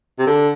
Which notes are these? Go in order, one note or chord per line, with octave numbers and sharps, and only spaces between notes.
C3
D3